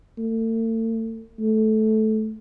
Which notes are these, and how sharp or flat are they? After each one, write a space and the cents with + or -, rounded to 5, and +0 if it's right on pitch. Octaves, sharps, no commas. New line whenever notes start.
A3 +40
A3 -15